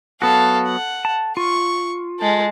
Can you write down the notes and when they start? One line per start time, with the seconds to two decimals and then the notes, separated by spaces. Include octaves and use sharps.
0.22 F#3 B3 F#4 A4 F5
0.66 F#5
1.05 A5
1.37 F4 C#6
2.19 G#3 A4